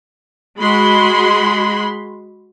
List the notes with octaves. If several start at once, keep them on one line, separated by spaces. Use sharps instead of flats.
G#3 F#4 B5 C6